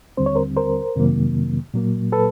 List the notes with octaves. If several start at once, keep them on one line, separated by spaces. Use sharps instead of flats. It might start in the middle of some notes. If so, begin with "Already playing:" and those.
D#2 D3 G3 C4 C5
C#5
A#4 C5
A#4 C5
F2 C3 D#3 F#3 A#3
A#2 F#3 A#3
A4 B4